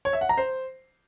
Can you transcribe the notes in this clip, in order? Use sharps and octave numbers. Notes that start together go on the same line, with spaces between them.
C#5
E5
F#5
A#5
C5